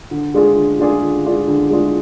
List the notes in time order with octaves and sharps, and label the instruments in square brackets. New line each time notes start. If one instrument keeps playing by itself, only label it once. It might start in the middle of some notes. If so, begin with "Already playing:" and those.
[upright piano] D3
G#3 D4 F4 G#4
D3
G#3 D4 F4 G#4
D3
G#3 D4 F4 G#4
D3
G#3 D4 F4 G#4